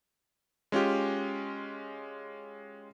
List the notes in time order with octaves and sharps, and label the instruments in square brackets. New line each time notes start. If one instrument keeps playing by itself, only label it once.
[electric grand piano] G#3 C#4 F4 G4